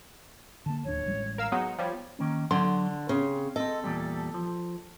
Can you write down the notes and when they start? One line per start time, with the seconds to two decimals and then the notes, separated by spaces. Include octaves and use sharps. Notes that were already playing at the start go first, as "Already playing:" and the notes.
0.66 D3 A#3 A5
0.85 D1 D#2 D4 C#5
1.06 A1 G3 G#3
1.38 A#4 F5 E6
1.52 F#3 G#3 B3 D#4 F#5
1.78 F3 G3 C#5
2.19 D#3 A#3 C#4
2.51 D3 F#3 D4 C6
3.09 C#3 C4
3.56 C4 A4 D#5
3.84 E2 A#2 G3
4.34 F3